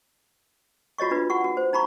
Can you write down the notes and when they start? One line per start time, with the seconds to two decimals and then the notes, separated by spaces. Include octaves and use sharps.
0.98 F4 F#4 C#5 D#5 C#6
1.11 D4 F4 B4
1.30 E4 F#4 F#5 C#6
1.44 F#4
1.57 C5
1.73 D#4 A#5 B5 C#6